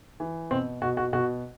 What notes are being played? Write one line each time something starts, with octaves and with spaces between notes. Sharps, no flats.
E3
B2 C4
B2 F#4
F#4
B2 F#4